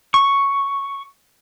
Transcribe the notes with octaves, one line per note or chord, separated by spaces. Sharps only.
C#6